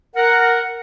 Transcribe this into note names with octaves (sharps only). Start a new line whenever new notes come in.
A#4 F#5